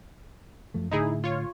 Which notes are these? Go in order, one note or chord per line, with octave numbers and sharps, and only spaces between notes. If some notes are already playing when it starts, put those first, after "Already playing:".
F#2 F3 A3
A2 D3 A3 D#4 E4 G#4
F4 C#5